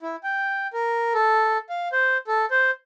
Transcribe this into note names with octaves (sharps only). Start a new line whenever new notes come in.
E4
G5
A#4
A4
F5
C5
A4
C5